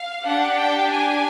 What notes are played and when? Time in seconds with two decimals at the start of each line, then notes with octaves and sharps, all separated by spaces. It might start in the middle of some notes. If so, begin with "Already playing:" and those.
Already playing: F5
0.24 D4 G4 F#5
0.57 G5
0.90 G#5